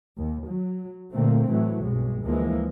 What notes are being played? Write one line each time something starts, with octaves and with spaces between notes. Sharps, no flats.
D#2
F#3
A#2 D3 A3 A#3 C4
A2 E3 F#3 A3
B1 G2 G#3
D2 E3 F3 G#3 A#3